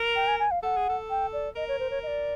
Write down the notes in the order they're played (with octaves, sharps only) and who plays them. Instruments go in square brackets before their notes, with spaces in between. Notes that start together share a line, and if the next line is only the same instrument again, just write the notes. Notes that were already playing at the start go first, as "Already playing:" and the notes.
Already playing: [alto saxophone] A#4
[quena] G5
G#5
G#5
F5
[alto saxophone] A4 [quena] F#5
[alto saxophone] G#4
A4
[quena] G5
D5
[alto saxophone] A#4 [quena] D#5
[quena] C#5
C5
C#5
D#5
D5